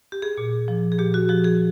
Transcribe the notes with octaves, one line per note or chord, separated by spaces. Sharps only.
G4
G#4
A#2
F3
G#4
A#2 G4
F#4
F3 G4
G#4